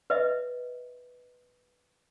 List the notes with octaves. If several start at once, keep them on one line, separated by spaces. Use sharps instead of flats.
B4 D#5 E5